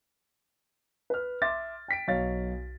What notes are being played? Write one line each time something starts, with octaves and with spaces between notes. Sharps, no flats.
B4 F6
E5 C6 D6 A6
G5 B6 D7
B1 C#5 F5 A6